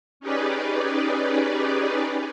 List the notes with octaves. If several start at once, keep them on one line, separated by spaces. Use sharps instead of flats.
C#4 D#4 G4 G#4 B4 D5